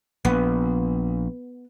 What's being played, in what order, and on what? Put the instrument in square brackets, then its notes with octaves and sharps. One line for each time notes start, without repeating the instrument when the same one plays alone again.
[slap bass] A#1 [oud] B3